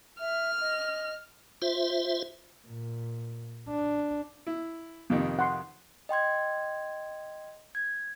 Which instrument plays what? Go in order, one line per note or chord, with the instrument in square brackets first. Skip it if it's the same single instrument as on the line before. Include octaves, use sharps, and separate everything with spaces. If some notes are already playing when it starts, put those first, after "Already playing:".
[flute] E5 [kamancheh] F6
[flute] D#5
[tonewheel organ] F4 C5 E5
[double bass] A#2
D4
[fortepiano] E4
F2 C3 D#3
[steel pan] F#5 C6
[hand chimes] D#5 G5 C6 G#6
G#6